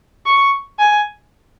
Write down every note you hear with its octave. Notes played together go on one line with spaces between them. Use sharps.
C#6
G#5